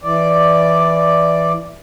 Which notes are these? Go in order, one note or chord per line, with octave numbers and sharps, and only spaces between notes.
E3 D5